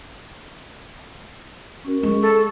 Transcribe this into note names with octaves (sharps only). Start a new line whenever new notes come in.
C#4 F#4 A#4
G#3 G#4 C#6
A4